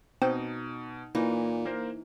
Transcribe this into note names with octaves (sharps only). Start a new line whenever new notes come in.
B2 C4 D#4
A#2 E3 A#3 D#4
A#3 A#4 C5